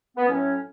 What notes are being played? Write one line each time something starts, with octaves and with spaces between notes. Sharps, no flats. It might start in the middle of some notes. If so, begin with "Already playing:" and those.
B3
A2 F#3 A3 C#4